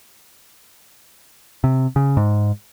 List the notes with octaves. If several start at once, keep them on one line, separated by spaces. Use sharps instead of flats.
C3
C#3
G#2